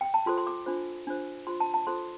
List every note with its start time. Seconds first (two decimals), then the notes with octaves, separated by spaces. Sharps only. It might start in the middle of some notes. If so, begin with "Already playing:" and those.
0.01 G5
0.14 A5
0.26 F4 A4 C5 C6
0.38 C6
0.47 D6
0.66 D4 F4 C5
1.07 D4 F4 C5
1.47 F4 C5 C6
1.60 A5
1.74 A5
1.87 F4 A4 C5 C6